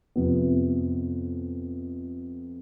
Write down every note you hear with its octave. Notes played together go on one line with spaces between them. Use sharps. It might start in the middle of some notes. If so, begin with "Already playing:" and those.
F2 C3 F3 B3